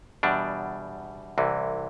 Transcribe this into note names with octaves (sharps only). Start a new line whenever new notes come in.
E2 B2 G3 D4
C2 C3 E3